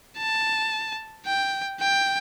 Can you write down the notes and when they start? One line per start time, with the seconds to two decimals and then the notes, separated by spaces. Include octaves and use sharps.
0.18 A5
1.26 G5
1.81 G5